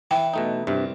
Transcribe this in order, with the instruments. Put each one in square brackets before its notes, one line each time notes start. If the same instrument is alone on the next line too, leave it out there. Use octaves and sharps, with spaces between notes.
[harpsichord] E3 [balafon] G5
[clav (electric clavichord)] B2 A3 D#4
[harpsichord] C2 [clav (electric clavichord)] G2 C3